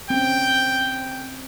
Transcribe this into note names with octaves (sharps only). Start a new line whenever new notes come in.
C4 C#4 G5